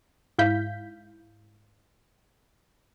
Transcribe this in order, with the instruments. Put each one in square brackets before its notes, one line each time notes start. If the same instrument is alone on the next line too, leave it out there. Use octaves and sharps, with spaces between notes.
[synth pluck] G#2 E4 F5 G6 B6